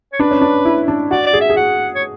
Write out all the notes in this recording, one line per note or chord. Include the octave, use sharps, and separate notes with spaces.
C#5
D4 B4
C#4
D4
E4
D4
F#4 D5
D5
G#4
E5
G#4
F#4 F#5
C#5